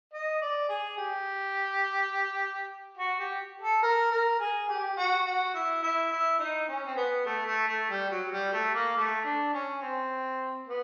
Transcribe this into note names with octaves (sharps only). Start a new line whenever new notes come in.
D#5
D5
G#4
G4
F#4
G4
A4
A#4
A#4
G#4
G4
F#4
F#4
E4
E4
E4
D#4
C#4
C4
B3
A3
A3
A3
G3
F#3
G3
A3
A#3
A3
D4
C#4
C4
B3